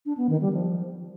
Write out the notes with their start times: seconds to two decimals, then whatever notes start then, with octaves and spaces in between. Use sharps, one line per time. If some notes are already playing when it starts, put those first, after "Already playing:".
0.06 D4
0.18 B3
0.29 D#3
0.41 G3
0.53 F3